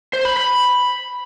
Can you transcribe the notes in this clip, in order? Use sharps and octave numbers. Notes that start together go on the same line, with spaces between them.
C5
B5
B5